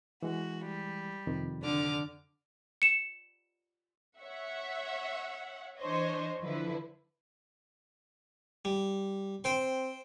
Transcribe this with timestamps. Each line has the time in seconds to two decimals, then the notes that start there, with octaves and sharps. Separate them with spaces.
0.23 E3 G#3 F#4
0.66 G3
1.27 F2 C3 D#3
1.62 D3 D6 F6
2.82 C#7 E7
4.20 C#5 E5 F#5
5.79 E3 D4 C5 C#5 D#5
6.43 D3 F3 E4 B4
8.65 G3
9.44 C4 C5 G5 C6